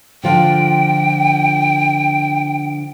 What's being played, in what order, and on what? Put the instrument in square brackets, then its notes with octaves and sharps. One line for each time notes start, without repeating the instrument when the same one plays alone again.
[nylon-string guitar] D3 F3 F4 [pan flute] G5